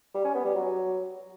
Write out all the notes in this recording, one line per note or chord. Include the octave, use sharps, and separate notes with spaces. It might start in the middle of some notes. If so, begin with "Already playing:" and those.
G3
C#4
B3
G3
F#3